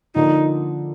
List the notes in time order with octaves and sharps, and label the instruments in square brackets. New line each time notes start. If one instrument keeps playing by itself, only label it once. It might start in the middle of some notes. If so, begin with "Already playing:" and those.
[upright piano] D3 F3 A#3 D4 [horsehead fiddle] D#4